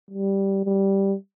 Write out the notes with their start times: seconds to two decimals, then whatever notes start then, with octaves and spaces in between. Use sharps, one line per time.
0.11 G3
0.65 G3